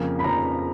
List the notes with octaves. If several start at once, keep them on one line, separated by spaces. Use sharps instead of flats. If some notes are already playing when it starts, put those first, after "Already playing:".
Already playing: F2 C#3 F3 A#3
B5
F2 C#3 F3 A#3 A#5